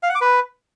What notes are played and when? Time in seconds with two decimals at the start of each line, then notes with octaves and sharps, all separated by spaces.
0.03 F5
0.09 F#5
0.15 D6
0.21 B4